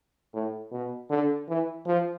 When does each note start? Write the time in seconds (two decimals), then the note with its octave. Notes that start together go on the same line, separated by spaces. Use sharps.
0.34 A2
0.72 B2
1.10 D3
1.49 E3
1.87 F3